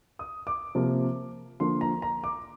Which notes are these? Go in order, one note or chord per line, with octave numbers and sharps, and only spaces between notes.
D#6
D6
C3 F3 A#3
D3 F3 A#3 C6
A#5
A#5
D6